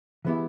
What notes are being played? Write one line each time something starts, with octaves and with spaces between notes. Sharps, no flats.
E3 G#3 B3 E4 G4